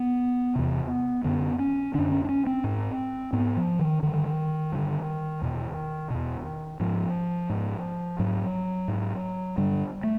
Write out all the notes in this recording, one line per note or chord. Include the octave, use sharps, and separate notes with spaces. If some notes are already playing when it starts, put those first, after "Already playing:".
Already playing: B3
E2 C3
F#2 D3 B3
C#4
F#2 D3 D4
C#4
D4
C#4
C4
G#2
G#2 B3
F3
D#3
G2 D3 D#3
G2 D3
E2 B2
E2 B2
G#2 F3
G#2
G#2 F#3
G#2
G2 D3 G3
A3